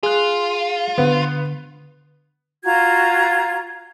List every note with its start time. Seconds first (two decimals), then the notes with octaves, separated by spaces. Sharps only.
0.03 F4 G#4 F#6
0.98 D3 B3
2.64 F4 F#4 A#5 G#6